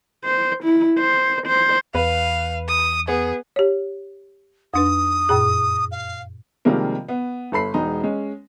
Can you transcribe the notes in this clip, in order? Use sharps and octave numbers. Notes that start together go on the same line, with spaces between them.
C5
E4
C5
C5
E2 B4 F5
D#6
B3 G#4
G4 C#5
F2 D4 B4 D#6
F#2 A#2 G#4
F5
C3 D#3 F3 G3 G#3 A#3
B3
G1 A4 B5 C7
E1 G#3 D#4 A#5
G#3 C#4